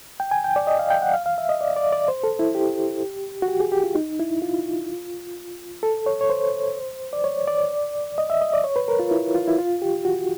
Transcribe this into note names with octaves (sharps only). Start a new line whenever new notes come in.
G5
G#5
G5
D5
D#5
F5
G5
F#5
F5
F5
E5
D#5
D5
D5
D5
C5
A4
E4
G4
F#4
G4
G#4
G4
F4
D#4
E4
F4
A4
C#5
C#5
C5
D5
C#5
D5
D#5
E5
D#5
D5
C#5
B4
A#4
F4
E4
F4
E4
F4
G4
F#4